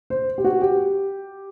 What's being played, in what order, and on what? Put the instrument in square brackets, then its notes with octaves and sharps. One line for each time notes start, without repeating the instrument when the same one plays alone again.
[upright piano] C5
G4
F#4
G4